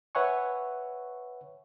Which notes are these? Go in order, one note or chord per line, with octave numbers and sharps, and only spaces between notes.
B4 C#5 E5 F#5 G#5 C#6